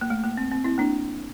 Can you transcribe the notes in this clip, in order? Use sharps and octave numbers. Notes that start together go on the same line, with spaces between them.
A#3
A3
A#3
C4
C4
C4 E4
A#3 D4